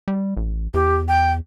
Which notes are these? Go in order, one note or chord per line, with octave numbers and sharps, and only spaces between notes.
G3
A1
E2 G4
G5